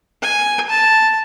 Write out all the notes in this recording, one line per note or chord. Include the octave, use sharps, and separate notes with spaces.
G#5
A5